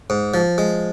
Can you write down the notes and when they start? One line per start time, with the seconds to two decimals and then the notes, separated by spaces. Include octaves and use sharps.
0.10 G#2
0.34 F3
0.58 G#3